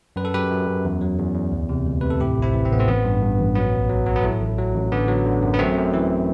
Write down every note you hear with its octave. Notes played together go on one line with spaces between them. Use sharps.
F#2 B4
A4
F#2 G4 B4
F#2
F#2
E2
F#3
E2
E2
D2
C3
D2
C3 B4
A4
A2 E4 G4
A1
C4 E4
E3
C4
A1 B3
A3 C4
A1 B3
G2
G2
A1
F#3 B3
B1
F#3
F#3
B3
A2 A3
A1
F#3
A1
D3 B3
F#3
D3
F#2
B3
F#2 A3 C4
F#2
E3